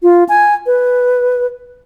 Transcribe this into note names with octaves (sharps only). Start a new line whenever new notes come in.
F4
G#5
B4